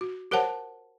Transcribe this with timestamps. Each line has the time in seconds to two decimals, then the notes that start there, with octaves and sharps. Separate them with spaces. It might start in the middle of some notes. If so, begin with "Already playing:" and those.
0.01 F#4
0.31 G4 A#4 C5 C#5 F#5 A5